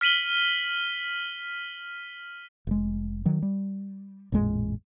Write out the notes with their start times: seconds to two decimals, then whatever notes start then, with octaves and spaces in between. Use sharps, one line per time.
0.01 F6 B6 D#7 F#7 G7
2.67 F1 G#3
3.25 D#3 F#3
3.42 G3
4.32 A1 F2 A#2 G#3